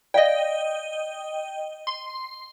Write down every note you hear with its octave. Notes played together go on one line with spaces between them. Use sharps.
D5 D#5 F5 G5
C6